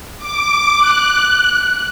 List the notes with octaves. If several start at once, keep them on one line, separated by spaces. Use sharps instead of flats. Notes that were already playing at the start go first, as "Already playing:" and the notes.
D6
F#6